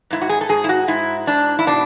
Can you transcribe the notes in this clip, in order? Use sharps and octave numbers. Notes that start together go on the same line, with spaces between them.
G#2 E4
F#4
G#4
A4
G#2 G#4
E4
F#4
G#2 E4
G#2 D4
E4
B2 D4